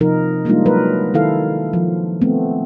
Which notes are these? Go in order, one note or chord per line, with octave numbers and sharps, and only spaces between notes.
C3 F3 D#4 A#4
G3 G#3 A#3 D4 D#4 F4
F#3 A#4 B4
D#3 E4 A4 F5
F3
A3 B3 C4